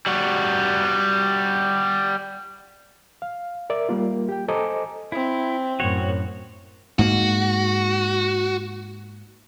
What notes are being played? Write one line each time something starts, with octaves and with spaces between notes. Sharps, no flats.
G3 F#4
F5
A#4 D5 E5
G3 A#3 F4
G4 G5
A4 C5 D#5 G#5 A#5 D6
C4 E4
F#2 A2 F#4 C#5
G#2 A#3 F#4